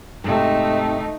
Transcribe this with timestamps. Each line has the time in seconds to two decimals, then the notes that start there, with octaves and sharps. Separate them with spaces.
0.24 G#2 C3 A3 D#4